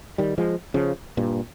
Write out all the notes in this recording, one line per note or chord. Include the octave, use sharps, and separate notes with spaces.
D#3 G3
F3 G#3
C#3 F3
G2 A#2